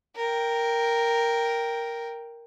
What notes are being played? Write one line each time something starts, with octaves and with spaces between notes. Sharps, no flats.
A#4 G5